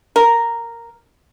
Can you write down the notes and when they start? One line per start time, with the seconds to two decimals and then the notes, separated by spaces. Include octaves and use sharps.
0.16 A#4